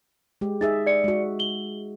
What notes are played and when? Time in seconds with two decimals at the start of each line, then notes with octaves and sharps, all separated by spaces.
0.41 G#3 G4
0.61 D#4 G#4 E5 A6
0.86 D5 C#7
1.04 G#3 F#4
1.39 F#7 G7